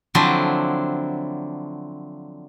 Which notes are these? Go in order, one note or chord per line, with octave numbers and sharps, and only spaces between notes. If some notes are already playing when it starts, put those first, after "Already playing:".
D3 F3 F#3 C4 D4 E4